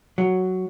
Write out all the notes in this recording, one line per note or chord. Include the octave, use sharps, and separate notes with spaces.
F#3